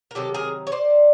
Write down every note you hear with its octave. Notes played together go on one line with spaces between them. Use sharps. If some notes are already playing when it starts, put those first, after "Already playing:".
A#4
C3 D#3 F#3 G4 A4
G#4 A#4
C#5
C5 D5